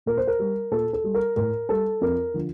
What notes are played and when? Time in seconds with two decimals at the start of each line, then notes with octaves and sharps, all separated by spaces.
0.06 A#2 A#4
0.17 C5
0.27 A#4
0.39 G3
0.71 A#2 A4
0.93 A4
1.04 G3
1.14 A#4
1.36 A2 A#4
1.69 G3 A4
2.01 F2 A#4
2.34 D3 F3